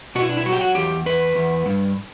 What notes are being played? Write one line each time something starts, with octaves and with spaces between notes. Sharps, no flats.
B2 F#4
E4
D4
E4
F#3 F#4
G4
F#4
E2 G4
E2 B4
E2
G2